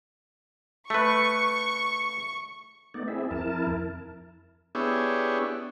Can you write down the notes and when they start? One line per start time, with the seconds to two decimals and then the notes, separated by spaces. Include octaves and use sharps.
0.90 A3 B4 C#6
2.94 A3 B3 D#4 D5
3.08 C4 E4 G#4 E5
3.31 F2 E4 A#4 A5
4.75 B3 D4 E4 G4 G#4 C#5